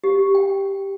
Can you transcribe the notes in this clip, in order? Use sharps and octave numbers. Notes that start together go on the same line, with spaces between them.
G4
G5